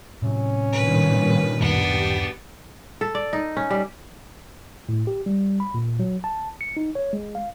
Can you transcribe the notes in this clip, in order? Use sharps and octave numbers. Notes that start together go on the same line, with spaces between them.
A2 C3 F#3 C#4
G2 A#2 D#3 B4
D1 F#2 B3 D4 G4 A6
A4
D5
D#4
C#4
G3
A2
G4
G3
B5
A#2
F#3
A5
C#7
D#4
C#5
G#3
F5